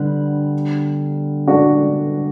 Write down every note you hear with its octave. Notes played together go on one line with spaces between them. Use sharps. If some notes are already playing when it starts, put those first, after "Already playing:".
Already playing: D3 G3 B3
D4 F#4